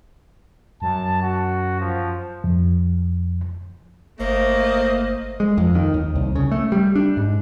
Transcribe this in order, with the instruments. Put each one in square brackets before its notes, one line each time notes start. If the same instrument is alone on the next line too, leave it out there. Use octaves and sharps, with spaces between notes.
[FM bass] F#2 [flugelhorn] A5
[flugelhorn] F#4
F3
[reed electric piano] F2
[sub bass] G1 [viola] A3 D#5 [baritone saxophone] A#3 [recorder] C5
[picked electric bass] G#3
F2
D#3
D#2
C2
C#3
A3
G3
D4
G#2